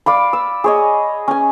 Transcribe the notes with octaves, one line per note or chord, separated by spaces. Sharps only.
D5 F5 B5
E6
G#4 C#5 D#5
C#4 G#5